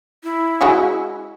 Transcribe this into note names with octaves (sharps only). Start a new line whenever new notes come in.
E4
G#3 F#4 G#4